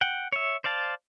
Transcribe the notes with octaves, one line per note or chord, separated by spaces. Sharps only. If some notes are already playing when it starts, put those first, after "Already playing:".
F#5 G5
C#5 E5
C5 D5 F5 A5